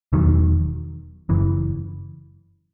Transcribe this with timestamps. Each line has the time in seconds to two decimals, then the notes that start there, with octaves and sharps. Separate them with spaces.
0.13 E1 E2 D#3 F#3
1.29 F#1 F#2 E3